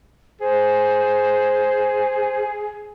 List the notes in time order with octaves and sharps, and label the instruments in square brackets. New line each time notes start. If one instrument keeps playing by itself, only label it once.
[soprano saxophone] G#4 [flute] C5